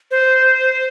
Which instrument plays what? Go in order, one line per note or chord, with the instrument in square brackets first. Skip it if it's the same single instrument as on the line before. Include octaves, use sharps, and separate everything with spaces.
[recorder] C5